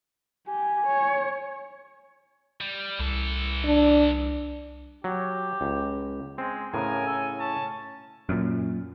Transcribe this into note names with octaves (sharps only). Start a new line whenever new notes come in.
G4 G#5
C#5
G3
C2 E3 A4
D4
F#3 G4
C#2
G#3 C4
A2 C#3 A#4 G#5
A4
C#4 A5
F#2 A#2